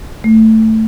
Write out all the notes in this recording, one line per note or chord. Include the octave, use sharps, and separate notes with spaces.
A3